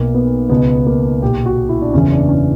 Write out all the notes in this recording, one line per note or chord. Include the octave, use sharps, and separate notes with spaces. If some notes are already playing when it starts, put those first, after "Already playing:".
Already playing: B1 B2 A#3
B3
C#2 B2 B3
A#3
B1 A#2 G4
F#4
E4
D4
F#1 E2 C#3 E3 C#4
D4
C#4